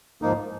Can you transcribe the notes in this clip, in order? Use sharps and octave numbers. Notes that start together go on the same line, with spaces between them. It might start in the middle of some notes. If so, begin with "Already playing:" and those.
G#2 F3 A#3 D#4